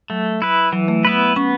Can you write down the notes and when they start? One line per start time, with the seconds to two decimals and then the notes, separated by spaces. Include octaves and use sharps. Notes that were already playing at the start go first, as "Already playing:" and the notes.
0.10 F#3 A3
0.42 E4 B4
0.72 E3 F#3
0.88 A3
1.05 B3 E4 B4
1.36 B3 C#4